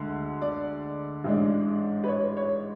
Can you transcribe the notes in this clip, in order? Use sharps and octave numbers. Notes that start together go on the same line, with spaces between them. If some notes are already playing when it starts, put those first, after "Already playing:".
Already playing: D2 D3 G#3
D5
A1 G#2 G#3 D4
B4
C#5
C#5